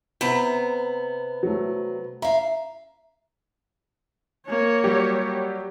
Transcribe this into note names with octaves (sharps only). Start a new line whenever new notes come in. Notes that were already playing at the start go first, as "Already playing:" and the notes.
C3 B3 A#5 B5 B6 E7
F#3 A3
E5 F5 A#5
A#3 C#5
F#3 G3 G4